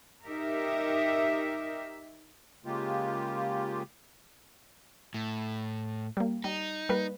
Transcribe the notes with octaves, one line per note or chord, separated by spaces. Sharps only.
D#4 G4 A#4 E5
C#3 G#3 A#3 F4 G4
A2
G3 A#3
G3 D#4
G3 A#3 B4